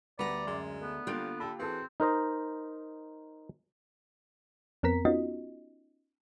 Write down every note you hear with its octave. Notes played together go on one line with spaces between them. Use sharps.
D2 G3 B3 D5 A#5
F#2 G#3 C6
A3 B3
D3 G3 A#3 F4 F#6 D7
D3 G4 A4 B5
E3 C4 F#4 G#4 A4
D#4 A#4 C5 D#5
F2 B3 C4 A#4 A#5 B6
B3 C#4 D#4 F4 F#4 D#5